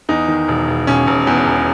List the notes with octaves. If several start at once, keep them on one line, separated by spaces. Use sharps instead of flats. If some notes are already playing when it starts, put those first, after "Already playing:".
E2 D#4
D#3
E1
E1
E1 C#4
E1
E2
E1